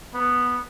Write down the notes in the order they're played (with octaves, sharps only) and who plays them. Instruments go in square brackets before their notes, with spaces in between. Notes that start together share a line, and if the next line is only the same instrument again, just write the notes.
[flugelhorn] B3